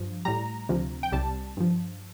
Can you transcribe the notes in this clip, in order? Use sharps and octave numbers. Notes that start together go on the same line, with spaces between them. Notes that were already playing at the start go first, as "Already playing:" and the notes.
Already playing: G2 F3
A2 G3 A#5
D2 C3 F3
G5
C2 C3 G3 A5
G2 F3